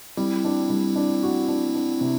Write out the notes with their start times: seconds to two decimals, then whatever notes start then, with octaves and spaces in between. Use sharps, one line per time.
0.17 G3 C4 E4
0.44 D4
0.70 G3
0.96 D4
1.23 F#4
1.48 D4
1.74 D4
2.01 C3